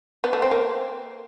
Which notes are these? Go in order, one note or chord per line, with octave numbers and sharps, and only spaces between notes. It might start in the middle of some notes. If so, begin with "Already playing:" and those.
B3
A3
C4
A#3